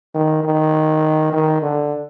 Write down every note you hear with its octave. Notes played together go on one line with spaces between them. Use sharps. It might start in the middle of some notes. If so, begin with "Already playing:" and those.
D#3
D#3
D#3
D3